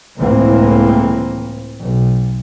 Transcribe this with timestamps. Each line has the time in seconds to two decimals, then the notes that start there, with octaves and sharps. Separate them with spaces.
0.18 C#2 A2 E3 A#3 C4
1.81 B1